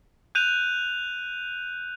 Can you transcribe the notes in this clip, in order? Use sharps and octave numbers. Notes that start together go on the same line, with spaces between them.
F#6 G6 D#7 F7